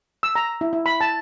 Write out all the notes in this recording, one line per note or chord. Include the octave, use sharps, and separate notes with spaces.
E6
A#5
E4
E4
B5
A5